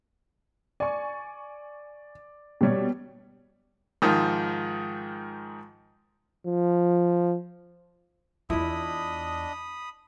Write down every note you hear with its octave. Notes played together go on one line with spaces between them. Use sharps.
D5 G#5 C#6
B2 G3 G4 C#5 D5
G#2 D#3 F3
F3
E2 D4 E4 F4 D#5 B5 D#6